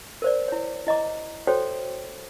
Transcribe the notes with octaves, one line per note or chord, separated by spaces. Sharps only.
A#4 C5 D5
E4 C#5
E4 D#5 A#5 D6
F#4 A4 C5 C#5 G5